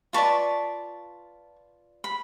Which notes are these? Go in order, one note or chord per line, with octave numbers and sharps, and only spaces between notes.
F4 B4 D5 A5 C#6
B5